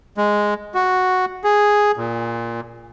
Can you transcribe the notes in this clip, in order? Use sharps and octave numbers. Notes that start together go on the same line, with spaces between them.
G#3
F#4
G#4
A#2